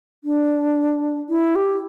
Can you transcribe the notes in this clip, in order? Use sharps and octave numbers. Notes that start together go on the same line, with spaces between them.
D4
E4
G4